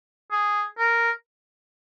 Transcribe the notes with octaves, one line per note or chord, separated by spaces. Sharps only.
G#4
A#4